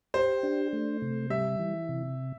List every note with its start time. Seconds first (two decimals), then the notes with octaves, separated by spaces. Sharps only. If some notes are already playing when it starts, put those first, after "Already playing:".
0.14 G4 C5
0.43 D4
0.73 A3
1.02 C3
1.30 G3 E5
1.59 E3
1.89 C3